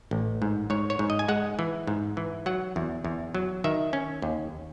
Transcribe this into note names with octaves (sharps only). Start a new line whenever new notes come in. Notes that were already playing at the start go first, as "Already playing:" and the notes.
A1
G#2
G#2 C#5
C#5
G#2
D#5
G#5
G#3 F#5
E3
G#2
E3
F#3 F#5
E2
E2
F#3
D#3 E5
C#4
D#2